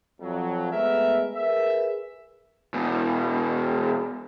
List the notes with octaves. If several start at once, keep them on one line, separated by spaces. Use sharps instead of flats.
F2 F#3
G#3 A3 B3 A#4 E5
G#4 A#4 B4 E5
E2 B2